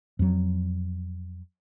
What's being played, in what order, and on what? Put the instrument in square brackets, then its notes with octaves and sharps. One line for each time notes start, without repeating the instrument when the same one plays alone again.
[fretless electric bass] F2 F#3